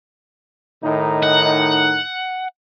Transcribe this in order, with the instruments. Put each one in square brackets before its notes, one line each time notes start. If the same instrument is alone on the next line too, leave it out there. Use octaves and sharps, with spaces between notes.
[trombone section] A2 D#3 D#4
[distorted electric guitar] F#5